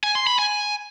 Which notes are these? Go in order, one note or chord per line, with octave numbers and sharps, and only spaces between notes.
G#5
C6
B5
G#5